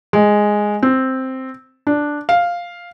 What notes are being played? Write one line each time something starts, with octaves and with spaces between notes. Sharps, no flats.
G#3
C4
D4
F5